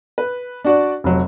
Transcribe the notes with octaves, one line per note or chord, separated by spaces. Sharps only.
B4
D4 F#4 D5
F1 F#3